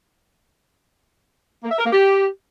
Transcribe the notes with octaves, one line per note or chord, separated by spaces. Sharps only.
A#3
E5
A#4
A#3
G4